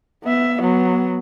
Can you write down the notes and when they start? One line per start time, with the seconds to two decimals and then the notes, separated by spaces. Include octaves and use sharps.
0.23 B3 E5
0.58 F#3 B3